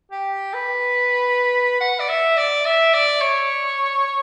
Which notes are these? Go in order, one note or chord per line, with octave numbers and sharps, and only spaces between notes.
G4
B4
F#5
D5
E5
D5
E5
D5
C#5